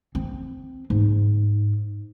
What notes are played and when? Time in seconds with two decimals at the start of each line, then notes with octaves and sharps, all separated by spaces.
0.15 C4
0.90 G#2